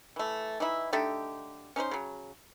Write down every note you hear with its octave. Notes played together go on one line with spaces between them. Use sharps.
E3 A3
E3 D#4 E4
D3 A3 D#4 G4
C#4 D#4 B4 C5
C#3 F#3